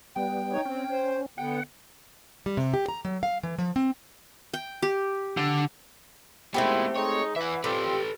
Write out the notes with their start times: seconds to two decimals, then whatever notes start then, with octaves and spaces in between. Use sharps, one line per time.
0.16 G3 B3 G5
0.52 D#4 C#5
0.66 C4 C#4
0.91 C5
1.38 D3 B3 F#5 G5
2.46 G3
2.57 C3
2.74 G4
2.89 A#5
3.05 F#3
3.23 F5
3.43 E3
3.59 F3
3.76 C4
4.53 G5
4.82 G4
5.37 D3
6.54 D#3 F3 G#3 A3 B3 C4 E4 G4
6.97 G#3 D#4 C#5
7.36 E3 E5 F#5
7.64 F3 G3 C4 G4 A4 B4